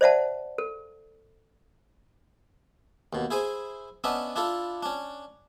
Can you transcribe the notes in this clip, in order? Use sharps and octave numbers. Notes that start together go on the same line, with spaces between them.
C5 D5 E5 F#5 A5
A4
D#2 B2
E4 G#4 C5 G#5
B3 C#4 D4 D#5 E5
D4 E4 F4 A4
C#4 D4